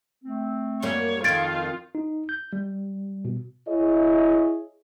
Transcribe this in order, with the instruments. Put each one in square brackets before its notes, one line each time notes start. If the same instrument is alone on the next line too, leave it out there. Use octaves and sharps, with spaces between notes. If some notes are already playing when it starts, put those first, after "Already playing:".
[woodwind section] A3 C4
[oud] F#2 G3 A#3 [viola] C#5
[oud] F2 D#3 [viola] F4 [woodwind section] A4 F5 [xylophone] G#6 A6 D7
[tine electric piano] D#4
G6
G3
B2
[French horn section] E4 G#4 C#5 D#5